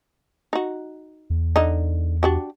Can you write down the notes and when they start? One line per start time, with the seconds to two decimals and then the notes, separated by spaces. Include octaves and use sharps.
0.53 D#4 F#4
1.30 E2
1.56 D3 D#4
2.23 D4 F#4 G4